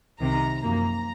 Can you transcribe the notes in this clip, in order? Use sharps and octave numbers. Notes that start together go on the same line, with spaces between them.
C2 C3 D#3 A#5
F#2 F3 A#3 A#5